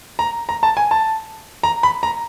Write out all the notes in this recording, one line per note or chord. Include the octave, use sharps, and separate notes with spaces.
A#5
A#5
A5
G#5
A5
A#5
B5
A#5